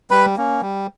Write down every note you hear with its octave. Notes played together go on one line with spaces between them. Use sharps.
G3 B4 B5
A#3 C#4
G3